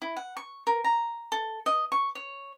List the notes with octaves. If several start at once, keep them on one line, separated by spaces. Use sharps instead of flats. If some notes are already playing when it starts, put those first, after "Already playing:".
E4
F#5
C#6
A#4
A#5
A4
D#5
C#6
C#5